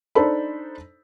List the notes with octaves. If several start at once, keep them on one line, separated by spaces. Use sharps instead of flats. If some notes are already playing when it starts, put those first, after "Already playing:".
D4 D#4 A4 C5 B5